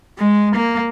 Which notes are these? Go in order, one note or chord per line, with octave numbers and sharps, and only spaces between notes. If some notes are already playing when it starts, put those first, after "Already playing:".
G#3
A#3